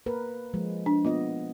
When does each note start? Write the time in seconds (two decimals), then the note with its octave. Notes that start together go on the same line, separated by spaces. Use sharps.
0.06 A#3 A#4 B4
0.54 F3 G#3
0.86 D4
1.05 A#3 B3 F4 D#5